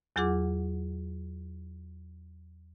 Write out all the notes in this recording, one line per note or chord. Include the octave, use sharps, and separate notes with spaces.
E2 F#3 F4 G#4 F#5 D6